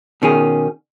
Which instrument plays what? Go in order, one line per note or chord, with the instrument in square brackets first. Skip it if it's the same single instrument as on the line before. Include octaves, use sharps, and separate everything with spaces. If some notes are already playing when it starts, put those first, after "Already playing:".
[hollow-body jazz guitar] B2 D#3 C#4 G#4